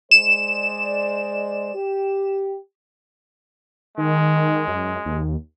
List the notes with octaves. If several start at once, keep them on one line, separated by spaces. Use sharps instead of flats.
G#3 C5 D5 E7
G4
D#3 G#3
F#2
D#2